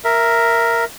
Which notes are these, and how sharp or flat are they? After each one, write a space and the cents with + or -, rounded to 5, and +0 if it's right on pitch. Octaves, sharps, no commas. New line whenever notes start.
A#4 +0 E5 +0